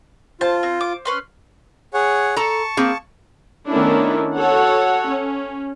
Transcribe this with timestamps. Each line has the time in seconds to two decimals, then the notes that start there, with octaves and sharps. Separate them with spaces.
0.41 F4 C5 A5
0.63 C4
0.81 D6
1.05 C#4 B4 C6
1.94 G#4 C#5 F#5
2.36 A4 A5 A#5 C#6
2.77 A#3 C4 G#4
3.67 D#3 A3 B3 C#4 D4 E4
4.36 F#4 A4 C#5 F#5
5.08 C#4